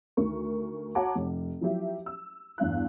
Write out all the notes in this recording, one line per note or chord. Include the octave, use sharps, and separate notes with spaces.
D2 D#3 A#4 C#6
F#4 C#5 F#5 A5 A#5 D6
F1
F3 F#3 E4 G4 E5
E6
E2 G2 F5 F#6